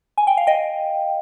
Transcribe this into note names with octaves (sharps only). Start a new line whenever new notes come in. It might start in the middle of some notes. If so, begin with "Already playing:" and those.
G#5
G5
F5
D#5 G5